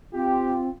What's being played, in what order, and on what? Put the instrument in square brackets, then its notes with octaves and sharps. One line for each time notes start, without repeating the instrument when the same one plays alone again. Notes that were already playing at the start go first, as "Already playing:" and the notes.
[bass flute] C4 [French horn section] F4 [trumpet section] G4